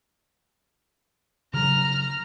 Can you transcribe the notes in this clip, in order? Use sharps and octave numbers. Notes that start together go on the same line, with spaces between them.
C#3 F#3 A#5 F6